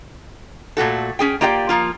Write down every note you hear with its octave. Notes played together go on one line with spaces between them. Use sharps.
A#2 A3 F#4 A4
C#4 G#4 G5
A#3 F4 G4 D5 F#5 G5
F3 A#3 F4